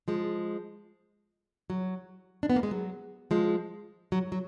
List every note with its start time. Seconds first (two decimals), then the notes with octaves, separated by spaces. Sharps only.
0.08 F3 G#3
1.70 F#3
2.43 D4
2.50 B3
2.56 A#3
2.63 G#3
2.71 F#3
3.31 F3 G#3
4.12 F#3
4.32 F#3